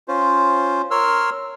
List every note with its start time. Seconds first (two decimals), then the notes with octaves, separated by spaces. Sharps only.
0.08 C#4 F4 C5
0.91 A#4 C#5 C6 E6 F6